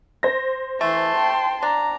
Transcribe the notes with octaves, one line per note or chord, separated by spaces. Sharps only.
C5 A#6
E3 A3 A5 C6
G5
D4 A#5